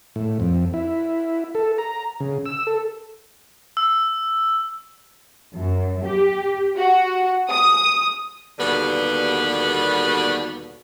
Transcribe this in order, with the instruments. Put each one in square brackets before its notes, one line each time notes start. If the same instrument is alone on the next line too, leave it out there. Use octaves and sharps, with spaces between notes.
[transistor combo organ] A2
F2
E4
A4
A#5
C#3
E6
A4
[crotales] E6
[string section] F#2
G4
F#4
D#6
[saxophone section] D#2 B2 D3 G3 B3